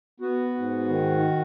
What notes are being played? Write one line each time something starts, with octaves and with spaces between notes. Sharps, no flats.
B3 F#4
G#2
D#3